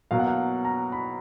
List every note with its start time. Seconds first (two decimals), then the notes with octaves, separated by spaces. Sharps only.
0.11 B2 F#3 A#3 F5
0.19 F#5
0.27 F5
0.65 A#5
0.92 B5